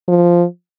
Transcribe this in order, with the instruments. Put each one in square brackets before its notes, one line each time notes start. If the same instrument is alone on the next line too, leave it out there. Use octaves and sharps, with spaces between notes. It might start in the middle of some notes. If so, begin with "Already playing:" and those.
[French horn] F3